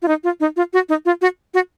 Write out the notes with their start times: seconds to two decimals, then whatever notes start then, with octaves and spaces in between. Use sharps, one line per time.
0.02 F4
0.08 D#4
0.24 F4
0.40 D#4
0.56 F4
0.73 F#4
0.89 D#4
1.05 F4
1.21 F#4
1.54 F#4